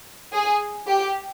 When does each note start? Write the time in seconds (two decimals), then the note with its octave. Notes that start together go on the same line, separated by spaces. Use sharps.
0.32 G#4
0.86 G4